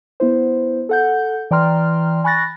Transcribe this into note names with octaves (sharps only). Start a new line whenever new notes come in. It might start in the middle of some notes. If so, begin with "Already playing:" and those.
B3 E4 C5
A4 F#5 G6
E3 D5 G5 A#5 C6 F6
G#5 B5 C#6 F#6 A6 A#6